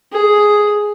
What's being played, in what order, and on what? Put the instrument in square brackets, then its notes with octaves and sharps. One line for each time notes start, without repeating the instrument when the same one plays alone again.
[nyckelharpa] G#4